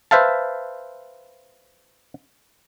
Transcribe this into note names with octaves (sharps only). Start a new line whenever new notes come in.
B4 C5 E5 F5 A5